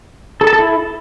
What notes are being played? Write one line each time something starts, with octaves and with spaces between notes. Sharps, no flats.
A4
A5
A4
E4